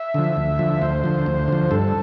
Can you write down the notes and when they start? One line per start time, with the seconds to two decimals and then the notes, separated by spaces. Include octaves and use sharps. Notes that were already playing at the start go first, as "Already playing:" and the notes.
Already playing: E5
0.14 D3 F3
0.37 D2
0.59 D3 F3
0.81 D2 C5
1.04 D3 F3
1.26 D2
1.48 D3 F3
1.71 G2 A4